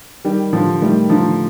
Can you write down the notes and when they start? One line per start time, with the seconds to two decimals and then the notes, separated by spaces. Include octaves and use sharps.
0.25 D#3 G3 G4
0.52 A2 D3 F3
0.81 D#3 G3 A3
1.10 D3 F3 D#4